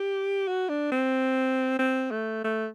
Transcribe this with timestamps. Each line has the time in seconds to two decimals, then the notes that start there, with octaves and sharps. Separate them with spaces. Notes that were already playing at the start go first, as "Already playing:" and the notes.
Already playing: G4
0.48 F#4
0.69 D4
0.92 C4
1.79 C4
2.11 A3
2.44 A3